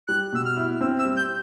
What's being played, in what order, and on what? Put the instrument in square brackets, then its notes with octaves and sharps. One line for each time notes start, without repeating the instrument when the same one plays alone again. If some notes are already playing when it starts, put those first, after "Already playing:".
[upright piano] G3 [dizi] F#6
[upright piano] B2 [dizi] E6
[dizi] F6
[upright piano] E4
[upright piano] C4 [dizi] E6
[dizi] E6
[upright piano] G3
[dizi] G6